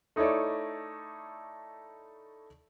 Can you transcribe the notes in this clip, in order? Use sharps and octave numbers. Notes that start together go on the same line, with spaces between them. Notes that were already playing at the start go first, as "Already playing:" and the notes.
A3 D#4 E4 A4 C#5 D5